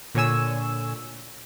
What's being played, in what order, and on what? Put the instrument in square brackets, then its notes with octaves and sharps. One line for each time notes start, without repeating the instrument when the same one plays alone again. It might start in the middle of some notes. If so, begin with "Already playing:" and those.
[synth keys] A#2 D3 C#5 G#5 E6